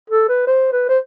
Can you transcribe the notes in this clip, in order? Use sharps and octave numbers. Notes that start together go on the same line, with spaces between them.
A4
B4
C5
B4
C5